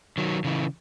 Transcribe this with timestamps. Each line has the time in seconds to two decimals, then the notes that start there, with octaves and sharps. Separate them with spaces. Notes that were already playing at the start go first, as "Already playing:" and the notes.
0.18 D#3 F#3
0.45 C#3 E3